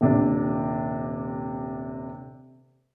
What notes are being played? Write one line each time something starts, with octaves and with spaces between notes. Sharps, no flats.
D#1 C3 D4